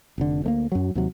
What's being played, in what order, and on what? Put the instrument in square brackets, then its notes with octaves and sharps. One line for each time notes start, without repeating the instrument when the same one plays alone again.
[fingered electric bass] F1 D3
D2 A3 A#3
F#2 F#3
D#2 C3 F#3